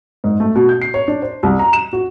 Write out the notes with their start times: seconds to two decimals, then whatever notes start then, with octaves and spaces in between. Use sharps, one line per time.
0.24 G#2
0.40 A3
0.55 B2
0.69 G6
0.81 C7
0.94 C#5
1.08 D4
1.22 C5
1.43 C2
1.59 A#5
1.73 E7
1.93 F#4